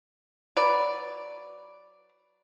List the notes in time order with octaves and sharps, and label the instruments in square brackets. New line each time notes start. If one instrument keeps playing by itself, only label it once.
[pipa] F#3 B4 D5